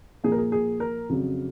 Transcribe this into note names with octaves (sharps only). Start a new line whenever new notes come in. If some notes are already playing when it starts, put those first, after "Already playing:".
A#2 F3 A#3 G#4
A#4
G#4
G#4
A#4
F2 C#3 F#3